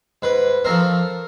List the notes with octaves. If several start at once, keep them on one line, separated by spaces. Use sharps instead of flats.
G#2 B4
F3 A3 C4 A#4